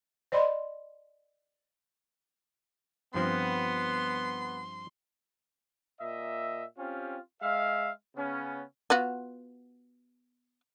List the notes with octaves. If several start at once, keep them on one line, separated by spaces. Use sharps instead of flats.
C5 D5 D#5 B5 C6
G2 F3 B3 C4 C6
A#2 D#5 E5
C4 C#4 F4 G4
G#3 E5 F5
C#3 B3 C#4
B3 F4 F#4